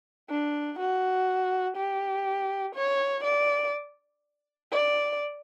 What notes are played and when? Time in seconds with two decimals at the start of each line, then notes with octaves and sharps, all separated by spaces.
0.30 D4
0.79 F#4
1.77 G4
2.75 C#5
3.24 D5
4.72 D5